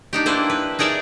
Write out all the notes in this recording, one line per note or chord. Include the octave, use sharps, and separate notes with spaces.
D4 D#4 G4
A#3 D4 E4 B4 C5
B4
D#4 G#4 A#4 D5 E5